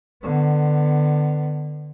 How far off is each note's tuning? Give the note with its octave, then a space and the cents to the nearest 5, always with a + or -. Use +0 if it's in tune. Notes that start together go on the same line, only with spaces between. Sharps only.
D3 +25 B3 +25